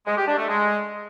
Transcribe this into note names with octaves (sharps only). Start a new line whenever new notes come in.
G#3
G4
D4
A3
G#3